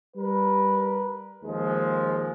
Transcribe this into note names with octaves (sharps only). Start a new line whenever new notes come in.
G3 A#4 B4
D#2 F3 G#3